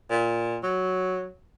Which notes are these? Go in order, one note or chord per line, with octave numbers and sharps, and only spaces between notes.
A#2
F#3